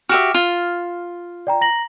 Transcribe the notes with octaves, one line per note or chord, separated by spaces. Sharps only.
F#4 G4 E5 F6 E7
F4
D5 G5 A#5
A#5 A#6 F#7